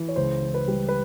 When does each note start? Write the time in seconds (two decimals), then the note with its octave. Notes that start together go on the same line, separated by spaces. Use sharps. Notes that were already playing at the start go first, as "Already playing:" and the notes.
Already playing: E3
0.08 C#5
0.16 C#2 C5
0.42 E3
0.54 B4
0.68 G3
0.89 B4